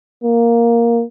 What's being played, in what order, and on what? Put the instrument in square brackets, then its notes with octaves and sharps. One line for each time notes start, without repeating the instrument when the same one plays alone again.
[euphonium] A#3